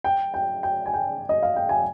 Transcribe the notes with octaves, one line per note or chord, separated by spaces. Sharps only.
G5
G5
G5
G#5
G5
D#5
F5
G5
G#5